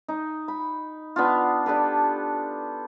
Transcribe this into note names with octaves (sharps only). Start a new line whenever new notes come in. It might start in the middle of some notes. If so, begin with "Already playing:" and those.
D#4
B5
B3 D4 F4
D4 G4 A4 B4